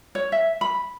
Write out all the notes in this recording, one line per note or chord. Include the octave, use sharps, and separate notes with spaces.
C#5
E5
B5